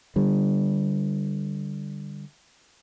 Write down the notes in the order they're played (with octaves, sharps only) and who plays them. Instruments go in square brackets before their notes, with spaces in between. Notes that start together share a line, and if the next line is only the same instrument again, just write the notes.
[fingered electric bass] D3 G3